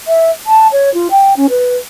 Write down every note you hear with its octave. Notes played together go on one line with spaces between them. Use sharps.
E5
A5
C#5
F4
G5
C#4
B4